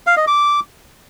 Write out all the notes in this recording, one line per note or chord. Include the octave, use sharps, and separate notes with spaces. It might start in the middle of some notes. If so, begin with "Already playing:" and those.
F5
D#5
D6